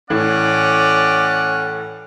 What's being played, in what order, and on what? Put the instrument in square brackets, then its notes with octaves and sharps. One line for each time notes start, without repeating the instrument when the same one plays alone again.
[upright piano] A2 E3 [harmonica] C#4 [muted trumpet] D5 [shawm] F#5